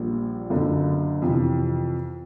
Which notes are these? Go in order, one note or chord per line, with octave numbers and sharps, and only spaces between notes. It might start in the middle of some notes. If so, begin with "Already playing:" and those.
Already playing: A#1 A#2 G3
F#1 F#2 D3
F2 C3 E3